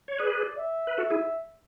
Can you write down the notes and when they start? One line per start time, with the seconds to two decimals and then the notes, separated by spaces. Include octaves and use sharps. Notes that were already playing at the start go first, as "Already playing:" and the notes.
0.08 C#5
0.19 G#4 B4 D5
0.58 E5
0.87 B4
0.98 F#4 A4 E5
1.10 E4 G#4